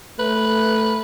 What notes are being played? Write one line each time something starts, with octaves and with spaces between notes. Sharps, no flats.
A3 B4